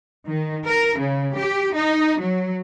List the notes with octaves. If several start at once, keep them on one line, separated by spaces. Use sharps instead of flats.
D#3
A#4
C#3
G4
D#4
F#3